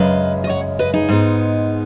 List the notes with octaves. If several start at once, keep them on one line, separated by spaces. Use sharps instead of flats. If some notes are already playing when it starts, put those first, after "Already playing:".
Already playing: F#2 C#3 G#3 B4 D#5
D#5
C#5 F#5
B4 D#5
D#4 G#4
G#2 G#3 B3